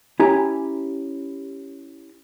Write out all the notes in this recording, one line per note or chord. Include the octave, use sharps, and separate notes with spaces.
C#4 E4 G4 G#5 A#5